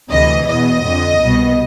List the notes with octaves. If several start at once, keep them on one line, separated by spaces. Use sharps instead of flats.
D2 C3 E3 D#5
E2 B2 D#5
F2 D3
C2 B2